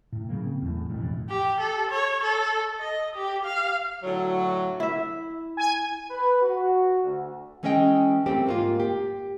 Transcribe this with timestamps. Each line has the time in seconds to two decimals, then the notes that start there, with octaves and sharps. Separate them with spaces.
0.12 A2
0.29 C#3 F#3 A#3
0.46 C4
0.62 E2 A2
0.90 E1 A1 F2 A2
1.30 G4
1.60 A4
1.91 C#5
2.23 A4
2.79 D#5
3.15 G4
3.45 F5
4.03 A2 D3 F#3
4.80 E4 E5
5.57 G#5
6.11 B4
6.42 F#4
7.03 D2
7.63 E3 G#3 C#4 G#4 D#5 G5
8.26 G3 A3 A#3 C4 G4
8.47 G#2 A#3 F4
8.80 G4